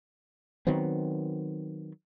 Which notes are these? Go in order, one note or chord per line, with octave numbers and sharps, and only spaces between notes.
D#3 F#3 B3 C4